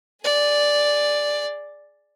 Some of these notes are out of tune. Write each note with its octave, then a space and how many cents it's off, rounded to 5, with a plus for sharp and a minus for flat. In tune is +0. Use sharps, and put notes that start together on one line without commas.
G#4 +0 D5 +0